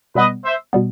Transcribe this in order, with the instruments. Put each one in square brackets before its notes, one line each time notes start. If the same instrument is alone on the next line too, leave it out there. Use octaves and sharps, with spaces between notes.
[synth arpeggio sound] B2 G3 B3 [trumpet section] B4 D#5
[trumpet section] C5 E5
[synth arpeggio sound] B2 G3 B3